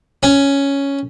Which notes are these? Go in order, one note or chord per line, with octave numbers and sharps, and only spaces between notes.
C#4